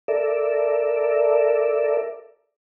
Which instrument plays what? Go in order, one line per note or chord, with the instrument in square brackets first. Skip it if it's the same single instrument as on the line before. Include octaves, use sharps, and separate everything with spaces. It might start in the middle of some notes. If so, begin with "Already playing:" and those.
[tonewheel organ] A4 A#4 D5 E5